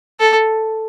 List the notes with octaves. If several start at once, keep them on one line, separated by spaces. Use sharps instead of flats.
A4